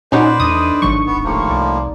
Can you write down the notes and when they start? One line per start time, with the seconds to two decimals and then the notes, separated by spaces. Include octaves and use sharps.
0.12 A#2 C#4 D#4 F#4 B4 C5 D5
0.40 E2 A3 D4 D#4 D#6
0.82 G#1 F#3 A5 C#6 D#6
1.06 D1 B3
1.24 A2 F3 A#3 G4 F5
1.50 C2 D5